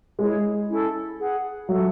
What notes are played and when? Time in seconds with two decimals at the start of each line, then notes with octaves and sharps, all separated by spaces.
0.19 G#3 E4 G#4 C#5
0.69 C#4 E4 A4
1.19 G#4 B4 F#5
1.68 F#3 F#4 A4 E5